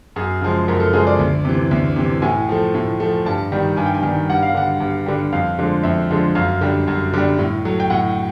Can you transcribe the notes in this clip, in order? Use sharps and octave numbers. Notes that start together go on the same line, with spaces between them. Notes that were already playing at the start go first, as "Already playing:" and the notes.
F#2 G#4
C#3 F3 G#3
F#2 A#4
A4
C#3 F3 G#3 G#4
D5
D2
C3 E3
D2
C3 E3
A2 G#5
F3 A3
A2
F3 A3
G2 A5
D#3 G3
G2 G#5
G5
G#5
D#3 G3
G2 F#5
F5
D3 G3 F#5
G2
D3 G3
F2 F5
D3 F3 G#3
F2 E5
D3 F3 G#3
F#2 F5
D3 G3
F#2
D3 G3
A2
F#3 A3
G5
A2 F#5